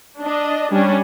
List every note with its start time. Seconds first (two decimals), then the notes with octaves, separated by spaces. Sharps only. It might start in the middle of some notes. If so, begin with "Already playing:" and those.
0.21 D4 D#5
0.72 G3 C#4 D4